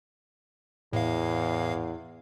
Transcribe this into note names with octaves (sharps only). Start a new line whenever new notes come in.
E2 A2 F5